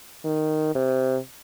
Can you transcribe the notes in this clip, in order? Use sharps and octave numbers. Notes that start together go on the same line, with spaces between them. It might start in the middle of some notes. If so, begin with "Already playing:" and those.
D#3
C3